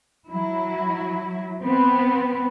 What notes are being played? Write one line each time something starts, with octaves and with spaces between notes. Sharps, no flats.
F#3 E4
B3 C4